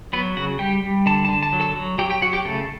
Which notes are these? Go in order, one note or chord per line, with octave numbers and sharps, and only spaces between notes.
F#3 B3 B4
C#3 F#4 F#5
G3 G4 G5
G3
D3 A5
D3 A5
A5
F#3
A4 A5
F#3
F#3 G4 G5
G4 G5
F#3 F#4 F#5
G4 G5
C#3 A3 A4